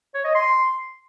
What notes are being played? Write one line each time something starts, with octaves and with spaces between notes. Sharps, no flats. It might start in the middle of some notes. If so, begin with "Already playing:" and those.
C#5
D#5
C6